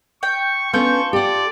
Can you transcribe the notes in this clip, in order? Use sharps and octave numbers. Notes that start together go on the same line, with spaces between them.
G5 C#6
B3 C#4 D4 F4 A4 C#6 G6
G4 D5 F#5